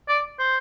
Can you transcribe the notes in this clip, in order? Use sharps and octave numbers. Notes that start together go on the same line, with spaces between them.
D5
C5